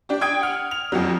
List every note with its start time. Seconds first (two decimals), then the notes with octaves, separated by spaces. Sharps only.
0.09 D4 G4
0.21 G5 D#6 G#6 D7
0.41 F#5 F6
0.71 F7
0.92 F2 F3 F#3